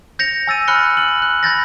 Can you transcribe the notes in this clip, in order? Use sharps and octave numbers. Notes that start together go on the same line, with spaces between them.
G6 A#6 C#7 F7
G#5 E6 A6 D#7
B5 F6 F#6 C#7 G7
F#7
F#6
B5 G6 A6 A#6